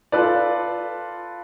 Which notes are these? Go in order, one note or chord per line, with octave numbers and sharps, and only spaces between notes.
F4 A4 B4 D5